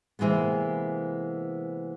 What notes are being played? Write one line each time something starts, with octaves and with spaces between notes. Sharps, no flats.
C3 E3 G#3 A#3 B3